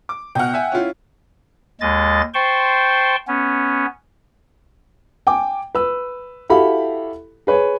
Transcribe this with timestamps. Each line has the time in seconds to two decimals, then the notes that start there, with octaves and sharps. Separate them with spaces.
0.09 D6
0.35 B2 F#5 G5 F6
0.54 E5 G#5
0.72 C#4 E4 F4
1.81 D#2 G#3 D#5 A6
2.34 C5 G5 A5 C6 C#6
3.28 B3 C#4
5.27 G5 G#5 D6
5.75 B4 E6
6.50 E4 F#4 G4 A4 F5 B5
7.47 G#4 B4 C#5